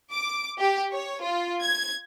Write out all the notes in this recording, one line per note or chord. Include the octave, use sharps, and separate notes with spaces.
D6
G4
C#5
F4
G#6